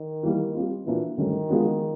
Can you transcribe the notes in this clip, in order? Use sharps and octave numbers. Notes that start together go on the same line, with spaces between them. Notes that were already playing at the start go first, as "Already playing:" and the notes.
Already playing: D#3
E3 G3 A#3
G3 C4 F4
A#2 E3 F3 A#3 D4 F#4
G2 D3 D#3 F#3 A3 C#4
F3 G#3 B3 D4 F#4